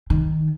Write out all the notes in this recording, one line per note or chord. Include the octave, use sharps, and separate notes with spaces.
D#3